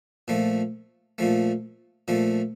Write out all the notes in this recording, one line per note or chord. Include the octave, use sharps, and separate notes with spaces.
A#2 F3 A3
A#2 F3 A3
A#2 F3 A3